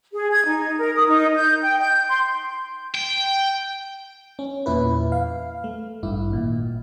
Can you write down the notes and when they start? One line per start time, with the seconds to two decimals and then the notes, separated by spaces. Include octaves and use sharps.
0.13 G#4
0.31 G#6
0.46 D#4
0.79 A#4
0.96 D#6
1.08 D#4
1.35 G6
1.63 G5
1.78 G6
2.08 C6
2.95 G5
4.39 C#4
4.66 E2 A#2 E4 B4
5.12 F5
5.64 A3
6.03 A1 G2 E4
6.30 G#1 A#2